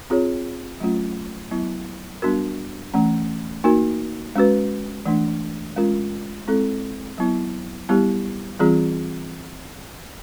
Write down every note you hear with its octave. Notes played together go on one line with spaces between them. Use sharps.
C4 F4 G#4 C#5
F#3 A3 C#4 F4
F#3 B3 E4
G3 B3 D4 F#4 A#4
E3 A3 C#4
A#3 D#4 F#4 A#4
G#3 C#4 F#4 B4
E3 A3 D4
G#3 C#4 F4 A#4
G#3 C4 E4 A4
F#3 B3 E4
G3 B3 E4 G4
E3 G3 C4 F4 G#4